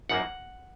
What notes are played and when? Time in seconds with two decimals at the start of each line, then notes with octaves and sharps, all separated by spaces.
0.09 G#1 F#2 D#3 A#3 F#5